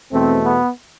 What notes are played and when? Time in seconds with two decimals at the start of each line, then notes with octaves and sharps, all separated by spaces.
0.11 E2 B2 A3 C4
0.42 B3